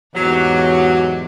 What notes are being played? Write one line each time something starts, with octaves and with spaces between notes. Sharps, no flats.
E2 G#2 F#3 G4